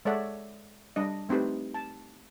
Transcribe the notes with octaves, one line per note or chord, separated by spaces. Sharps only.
G#3 A4 C#5 D5 E5 F#5
G3 D4 D#5
A3 C4 D#4 G4 B4
A5